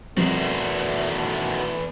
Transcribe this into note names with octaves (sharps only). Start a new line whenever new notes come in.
E2 B2 D#3 F3 G3 A3 C4 C5